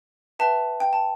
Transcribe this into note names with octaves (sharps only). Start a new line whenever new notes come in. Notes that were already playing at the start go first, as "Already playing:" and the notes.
B4 E5 G5 A5
G5
A5